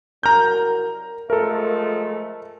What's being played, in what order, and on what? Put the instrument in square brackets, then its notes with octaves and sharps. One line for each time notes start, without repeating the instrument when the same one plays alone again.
[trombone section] C2 F#3 A#4 [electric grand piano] A#5 F6 G6
[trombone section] F3 G#3 A3 [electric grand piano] A4 A#4